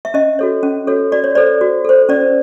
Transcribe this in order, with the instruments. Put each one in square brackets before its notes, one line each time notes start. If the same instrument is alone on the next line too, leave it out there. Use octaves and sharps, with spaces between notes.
[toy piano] E5
C#4 D#5
F#4 A4 C#5
C#4
F#4 A4 C#5
F#4 D5
C#5
A4 C5 D5
F#4
A4 C5
C#4 D5